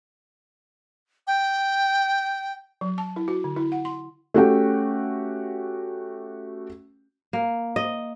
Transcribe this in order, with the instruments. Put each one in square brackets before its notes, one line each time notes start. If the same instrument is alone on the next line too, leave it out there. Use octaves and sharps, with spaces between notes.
[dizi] G5
[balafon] F#3
A5
E4
F#4
D3
E4
F#5
C6
[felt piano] A3 C#4 F#4 G4 A4 G5
[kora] A#3
D#5